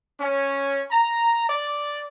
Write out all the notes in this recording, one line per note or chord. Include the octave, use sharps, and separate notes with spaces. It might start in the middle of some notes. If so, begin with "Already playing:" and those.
C#4
A#5
D5